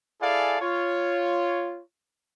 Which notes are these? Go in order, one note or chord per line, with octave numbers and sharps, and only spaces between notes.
E4 G#4 A4 D5 F5 G#5
F4 C#5